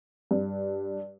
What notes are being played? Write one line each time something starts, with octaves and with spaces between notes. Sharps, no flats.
G2